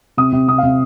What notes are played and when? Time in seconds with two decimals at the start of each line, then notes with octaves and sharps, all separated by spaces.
0.17 C3 D#6
0.32 C3
0.48 C3 D#6
0.58 F5
0.63 C3